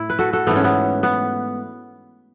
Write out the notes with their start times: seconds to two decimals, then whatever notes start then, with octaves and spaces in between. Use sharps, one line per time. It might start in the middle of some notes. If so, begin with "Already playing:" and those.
Already playing: A2 A3 E4
0.10 B4
0.19 F#4 A4
0.33 F#4 A4
0.47 G#2 E3 A3 B3
0.56 C#4
0.64 B3
1.03 B3